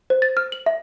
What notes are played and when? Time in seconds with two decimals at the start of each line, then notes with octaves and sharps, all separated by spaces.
0.10 C5
0.22 A6
0.37 F6
0.52 F#7
0.66 E5